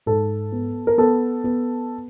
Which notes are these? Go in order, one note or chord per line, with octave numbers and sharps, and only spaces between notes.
G#2 A4
B3
A#4
B3 A4
B3